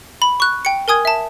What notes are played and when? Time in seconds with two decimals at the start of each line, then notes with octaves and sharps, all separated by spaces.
0.22 B5
0.40 C#6 F#6
0.65 G5 C#7
0.88 A#4 G#5 D#6 G#6
1.05 E5 A5